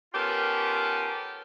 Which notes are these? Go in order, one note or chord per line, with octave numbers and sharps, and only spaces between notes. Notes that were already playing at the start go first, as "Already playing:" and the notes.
B3 C#4 F4 G4 A4 A#4